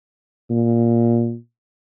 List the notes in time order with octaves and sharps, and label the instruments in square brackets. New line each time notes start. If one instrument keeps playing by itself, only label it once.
[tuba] A#2